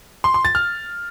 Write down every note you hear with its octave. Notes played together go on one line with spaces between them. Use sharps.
C6
C6
A6
F6